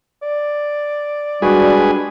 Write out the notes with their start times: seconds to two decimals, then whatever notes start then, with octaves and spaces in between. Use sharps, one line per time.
0.22 D5
1.42 G3 G#3 D4 F#4 G#4 B4